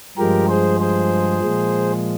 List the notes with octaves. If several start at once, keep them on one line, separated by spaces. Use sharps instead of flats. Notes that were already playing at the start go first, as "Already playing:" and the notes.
G2 F3 G#3 G4 A#4
G#4 C5
G#4 C5
A#2 F3 G#3